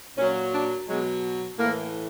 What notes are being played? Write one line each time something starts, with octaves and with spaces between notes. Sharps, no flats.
A#2 F#3 C#4
D4
B2 F#3 G#3
A2 E3 A#3